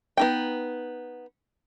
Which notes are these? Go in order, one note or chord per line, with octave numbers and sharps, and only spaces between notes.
B3 D#4 G5